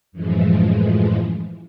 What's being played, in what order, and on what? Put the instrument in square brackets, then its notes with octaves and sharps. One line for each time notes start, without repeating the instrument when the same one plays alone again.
[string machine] F#2 A2 E3 F3 G#3